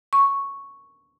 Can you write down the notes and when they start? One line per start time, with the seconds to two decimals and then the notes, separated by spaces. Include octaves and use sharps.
0.13 C#6